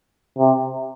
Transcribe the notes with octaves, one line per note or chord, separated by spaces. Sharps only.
C3